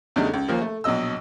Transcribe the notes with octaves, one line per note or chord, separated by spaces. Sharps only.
E2 C#3 G3 A3 D4 D#4
C#2
D#2 F3 A#3
A3
A#1 B2 F#3 D#5 E6